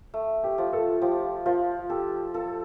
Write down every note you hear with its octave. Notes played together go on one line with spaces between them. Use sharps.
A3
G4
F3
A4
F3 G4
F3 F4
G4 A4
F4 A4